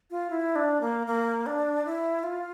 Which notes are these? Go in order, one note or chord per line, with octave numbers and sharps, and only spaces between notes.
F4
E4
D4
A#3
A#3
D4
E4
F4